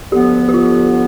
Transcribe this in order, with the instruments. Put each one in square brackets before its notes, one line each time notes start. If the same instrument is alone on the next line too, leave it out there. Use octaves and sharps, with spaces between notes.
[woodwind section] D2 D3 F3 B3 [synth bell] G4
[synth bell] G4
F4